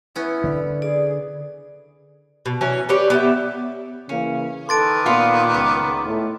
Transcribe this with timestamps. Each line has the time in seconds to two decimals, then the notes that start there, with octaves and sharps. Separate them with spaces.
0.16 B3 C#4 E4
0.44 D3
0.82 G#4 D5
2.46 B2
2.61 E3 F#3 C#4
2.89 G4 B4 C#5 D5
3.10 B3 G4 E5
4.09 C#3 E3 A#3 C#4
4.69 D#3 A4 B4 C6 D6 A6 D7
5.06 A#2 B3 F4
5.54 C#2 B3
6.06 A2